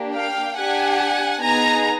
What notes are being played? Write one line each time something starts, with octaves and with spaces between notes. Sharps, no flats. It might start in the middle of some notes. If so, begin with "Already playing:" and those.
Already playing: A#3 D4 G4
F5 G5
D4 G4 F#5 G#5
B3 D#4 G#4 G#5 A#5